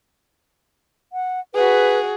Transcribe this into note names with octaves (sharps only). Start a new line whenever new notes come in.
F#5
F#4 G#4 B4